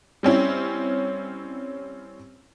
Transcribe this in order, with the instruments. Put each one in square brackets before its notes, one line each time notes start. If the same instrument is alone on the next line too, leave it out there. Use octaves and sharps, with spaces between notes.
[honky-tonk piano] G3 C4 C#4 E4